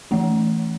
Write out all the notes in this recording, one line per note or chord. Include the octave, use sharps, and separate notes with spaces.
E3 A3 C#4